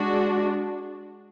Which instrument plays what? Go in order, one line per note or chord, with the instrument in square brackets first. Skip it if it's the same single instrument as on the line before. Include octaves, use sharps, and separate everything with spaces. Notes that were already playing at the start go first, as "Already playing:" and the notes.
Already playing: [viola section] G#3 D4 F#4